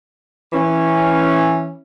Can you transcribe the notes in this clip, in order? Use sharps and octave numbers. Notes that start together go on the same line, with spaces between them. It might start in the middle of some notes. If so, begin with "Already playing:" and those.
E3 C#4